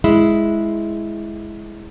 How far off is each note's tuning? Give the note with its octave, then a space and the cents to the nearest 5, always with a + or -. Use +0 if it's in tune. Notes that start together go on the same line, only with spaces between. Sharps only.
G#3 +5 E4 +0